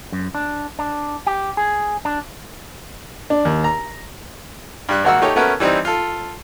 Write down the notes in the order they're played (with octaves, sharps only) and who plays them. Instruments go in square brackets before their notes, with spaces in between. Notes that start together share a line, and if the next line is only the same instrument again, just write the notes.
[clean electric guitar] F#2
D4
D4
G4
G#4
D4
[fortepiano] D4
D#2
A#5
G2 G3 F#6
G#1 A#3 F#4 F#5 E6
A3 D#4 G4 C#5
A3 B3 C#4 F#4 A#4 B4
E3 G3 C4 D#4
F4 A4